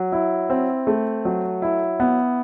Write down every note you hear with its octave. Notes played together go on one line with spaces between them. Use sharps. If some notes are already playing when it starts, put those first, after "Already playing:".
Already playing: F#3
E4
C4
A3
F#3
E4
B3